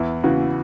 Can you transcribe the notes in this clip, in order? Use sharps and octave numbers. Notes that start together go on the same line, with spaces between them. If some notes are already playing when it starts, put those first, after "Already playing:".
Already playing: E2 E4
C#3 E3 F#4